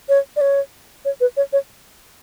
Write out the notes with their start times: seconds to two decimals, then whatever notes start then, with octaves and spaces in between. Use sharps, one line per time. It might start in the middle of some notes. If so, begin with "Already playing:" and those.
0.09 C#5
0.36 D5
0.41 C#5
1.05 C#5
1.21 B4
1.37 C#5
1.53 C#5